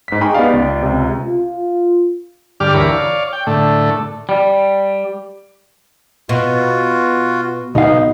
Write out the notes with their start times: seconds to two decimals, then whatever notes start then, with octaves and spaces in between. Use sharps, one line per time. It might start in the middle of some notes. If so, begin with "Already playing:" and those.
0.08 G#2 B6
0.21 D#4 G#4 G5 A#5 B5 C#6
0.35 B3 D#4 G4 D5 F5
0.50 C#2 D5
0.82 C#2 C3
1.25 F4
2.60 G2 D3 G4 D6 F6
2.74 D2 E3 A#4 C#5 B5 D6
2.92 C#5 D5 F5
3.33 G5
3.47 A2 D3 A3
4.29 G3
6.29 B2 F4 F#4
7.75 B1 B3 D#4 F5